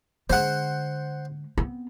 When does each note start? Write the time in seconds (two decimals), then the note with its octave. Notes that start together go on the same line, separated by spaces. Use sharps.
0.30 D3 G#3 C5 F#5
1.58 B3 C4